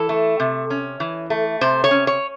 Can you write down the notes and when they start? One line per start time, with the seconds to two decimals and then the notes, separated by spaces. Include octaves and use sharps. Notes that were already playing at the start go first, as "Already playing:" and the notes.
Already playing: E3 A4
0.09 A3
0.40 C3
0.70 C#4
1.00 E3
1.30 A3
1.61 C3 C5
1.84 C#5
1.91 C#4
2.07 C#5